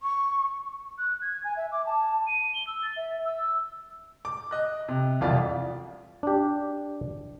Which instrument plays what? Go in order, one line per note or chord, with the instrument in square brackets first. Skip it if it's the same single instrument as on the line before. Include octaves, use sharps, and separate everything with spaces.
[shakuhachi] C#6
[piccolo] F#6
G#6
G#5
E5
D6
A5
D#7
G7
E6
A6
E5
E6
[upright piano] D6
D#5 F#6
C3
E1 C2 F2 F4 D5
[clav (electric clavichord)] D4 G4